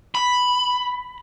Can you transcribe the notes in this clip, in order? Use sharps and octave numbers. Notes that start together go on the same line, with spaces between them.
B5